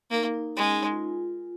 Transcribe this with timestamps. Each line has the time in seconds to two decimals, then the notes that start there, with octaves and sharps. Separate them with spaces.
0.11 A#3 D#4
0.34 D#4
0.56 G#3 C#4
0.80 D#4
0.91 F4